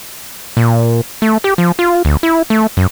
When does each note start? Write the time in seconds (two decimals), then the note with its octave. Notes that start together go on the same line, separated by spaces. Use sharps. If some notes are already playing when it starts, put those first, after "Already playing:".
0.57 A#2
1.22 A3
1.44 G4
1.58 F3
1.79 F4
2.05 D2
2.23 E4
2.50 A3
2.77 F#2